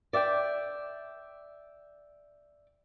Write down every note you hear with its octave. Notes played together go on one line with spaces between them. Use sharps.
D5 E5 F#5 G5